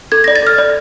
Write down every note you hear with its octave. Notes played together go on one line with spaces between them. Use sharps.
A4 G#6
D5 A#6
A6
A4 F6
D5